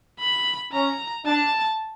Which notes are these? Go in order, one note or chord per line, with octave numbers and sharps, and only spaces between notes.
B5
C#4 A#5
D4 A5